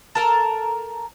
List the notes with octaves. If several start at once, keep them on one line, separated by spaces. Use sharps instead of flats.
A4 A#4 A5